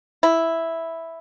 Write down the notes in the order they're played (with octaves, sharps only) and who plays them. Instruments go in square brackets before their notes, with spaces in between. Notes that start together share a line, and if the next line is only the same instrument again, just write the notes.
[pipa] E4